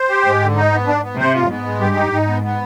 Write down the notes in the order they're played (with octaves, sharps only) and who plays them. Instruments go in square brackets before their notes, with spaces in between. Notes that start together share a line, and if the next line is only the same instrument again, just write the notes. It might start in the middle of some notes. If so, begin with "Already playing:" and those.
Already playing: [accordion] C5
G4
[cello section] G#2 [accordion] G#3
[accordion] D3
D#4
B3
D4
B3
[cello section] C3 [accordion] C5
[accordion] F4
[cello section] G#2 [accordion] B3
[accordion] G#3
[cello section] G2 [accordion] G4
[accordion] D#4
[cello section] G#2 [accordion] D#4
[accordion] B3
B3